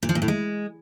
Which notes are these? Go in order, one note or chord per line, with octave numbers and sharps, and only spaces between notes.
A#2
F3
A#2
A2
G#3